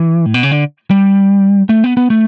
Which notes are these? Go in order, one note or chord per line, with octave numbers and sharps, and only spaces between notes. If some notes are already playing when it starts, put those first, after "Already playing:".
Already playing: E3
A2
B2
C#3
D3
G3
A3
B3
B3
A3